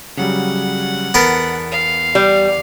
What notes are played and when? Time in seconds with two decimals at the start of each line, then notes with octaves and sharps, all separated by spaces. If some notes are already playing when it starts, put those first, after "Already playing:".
0.17 C#3 F#3 G3 F#5
1.14 E2 B3 A4 A#4
1.71 F5
2.15 G3